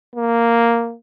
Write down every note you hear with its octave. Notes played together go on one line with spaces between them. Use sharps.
A#3